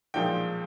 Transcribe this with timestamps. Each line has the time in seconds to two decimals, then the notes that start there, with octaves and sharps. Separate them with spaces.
0.14 B1 A#2 F3 G#3 G5